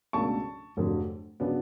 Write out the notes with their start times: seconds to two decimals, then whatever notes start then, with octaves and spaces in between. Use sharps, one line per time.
0.13 C#2 B2 F#3 A3 D4 A5 C#6
0.77 F1 F2 D3 F#3
1.40 C#3 F#3 B3 D4